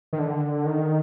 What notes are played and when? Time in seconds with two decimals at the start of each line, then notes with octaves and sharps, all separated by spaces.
0.13 D#3
0.19 D3
0.66 D#3